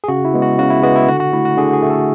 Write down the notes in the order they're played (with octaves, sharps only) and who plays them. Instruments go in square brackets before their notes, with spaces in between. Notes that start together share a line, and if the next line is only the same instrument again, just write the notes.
[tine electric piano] G#4
C#3 F#4
E4
G#3 B3
F#4
C#3 F#4
E4
G#3 B3 F#4
E4
D3 F#4
F#4
A3 E4
F#4
D3 G#4
G#4
A3
A4